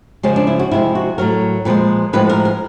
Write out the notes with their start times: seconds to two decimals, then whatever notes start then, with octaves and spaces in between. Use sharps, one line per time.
0.23 C#3 F3 G#3 C#4
0.36 D4
0.47 E4
0.59 F#4
0.71 C3 F3 G#3 E4
0.95 F#4
1.18 A2 F#3 A#4
1.65 A#2 F3 G#3 B4
2.13 A2 F3 G#3 B4
2.29 A#4
2.45 A#4